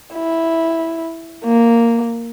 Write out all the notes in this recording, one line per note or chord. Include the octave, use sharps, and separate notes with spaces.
E4
A#3